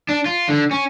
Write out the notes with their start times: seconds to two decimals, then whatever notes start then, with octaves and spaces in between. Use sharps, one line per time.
0.09 D4
0.26 F4
0.48 D3
0.71 C#4